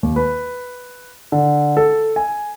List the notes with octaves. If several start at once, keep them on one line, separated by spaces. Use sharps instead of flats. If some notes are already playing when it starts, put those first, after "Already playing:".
D#2
B4
D3
A4
G#5